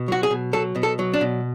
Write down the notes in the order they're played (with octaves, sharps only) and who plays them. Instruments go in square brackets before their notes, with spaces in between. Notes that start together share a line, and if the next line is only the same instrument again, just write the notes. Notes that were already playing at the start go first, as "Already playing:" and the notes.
Already playing: [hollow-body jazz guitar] B2
F#3 F#4
G#4
B2
F#3 A4
B2
A4
F#3
D4
B2